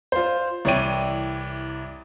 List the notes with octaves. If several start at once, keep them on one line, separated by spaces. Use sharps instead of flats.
F4 C5
C2 E3 C#5 D5 G5 D#7